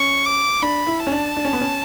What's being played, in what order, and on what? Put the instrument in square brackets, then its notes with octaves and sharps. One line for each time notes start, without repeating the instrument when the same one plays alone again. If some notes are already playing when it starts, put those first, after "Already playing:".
Already playing: [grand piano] C#4 [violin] C#6
[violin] D6
[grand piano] D4 [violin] B5
[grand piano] E4
[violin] A5
[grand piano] C#4
D4
D4
C#4
B3
C#4